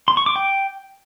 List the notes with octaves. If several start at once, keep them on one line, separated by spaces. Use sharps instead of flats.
C6
C#6
D6
G5